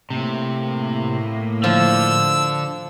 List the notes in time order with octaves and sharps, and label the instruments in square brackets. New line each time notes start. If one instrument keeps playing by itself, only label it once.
[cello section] A2 A#3 [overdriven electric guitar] C3
[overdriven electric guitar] D3 [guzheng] F3 [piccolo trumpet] E6